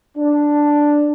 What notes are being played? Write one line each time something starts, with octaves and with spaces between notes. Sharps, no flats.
D4